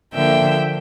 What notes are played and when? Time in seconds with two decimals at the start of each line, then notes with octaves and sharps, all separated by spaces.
0.14 D3 F3 A#3 E5 G5